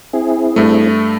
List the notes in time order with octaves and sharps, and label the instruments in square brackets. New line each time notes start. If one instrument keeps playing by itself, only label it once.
[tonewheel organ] C4 E4 G#4
[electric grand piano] G2 A3